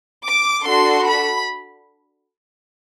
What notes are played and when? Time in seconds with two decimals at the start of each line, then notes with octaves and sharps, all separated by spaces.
0.25 D6
0.64 D4 F#4 A4 C6
1.04 B5